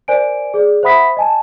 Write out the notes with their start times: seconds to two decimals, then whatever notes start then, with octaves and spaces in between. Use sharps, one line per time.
0.08 A#4 C5 D5 G#5 D7
0.54 G#4 D5
0.83 C5 E5 F#5 B5 D#6 B6
1.17 D#5 G#5 A5